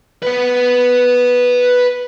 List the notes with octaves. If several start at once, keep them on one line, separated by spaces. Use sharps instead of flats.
B4 F#5